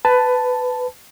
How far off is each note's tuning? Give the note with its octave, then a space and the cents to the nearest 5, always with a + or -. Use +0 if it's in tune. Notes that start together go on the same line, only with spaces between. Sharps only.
B4 +15 A5 +0